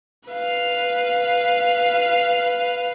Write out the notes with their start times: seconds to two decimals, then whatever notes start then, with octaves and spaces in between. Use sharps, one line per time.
0.29 B4 F5